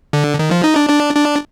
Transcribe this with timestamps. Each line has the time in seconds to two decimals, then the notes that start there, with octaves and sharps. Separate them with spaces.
0.13 D3
0.39 D#3
0.51 F3
0.64 D#4
0.76 D4
0.89 D4
1.15 D4